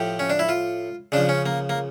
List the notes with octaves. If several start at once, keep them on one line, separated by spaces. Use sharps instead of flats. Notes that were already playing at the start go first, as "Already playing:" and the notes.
Already playing: A2 F3 G4
C#4
D4
E4
F4
C#3 F3 D4
C#4
A#3
A#3